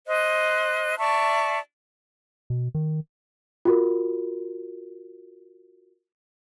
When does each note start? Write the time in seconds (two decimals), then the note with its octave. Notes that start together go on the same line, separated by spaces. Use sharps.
0.07 C5 D#5 F#6
0.98 D5 E5 A5 C#6
2.50 B2
2.75 D#3
3.65 F4 F#4 A#4